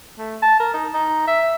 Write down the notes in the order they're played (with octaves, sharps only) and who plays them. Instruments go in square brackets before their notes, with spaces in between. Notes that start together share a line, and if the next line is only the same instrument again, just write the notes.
[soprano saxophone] A3
A5
A#4
D#4
D#4
E5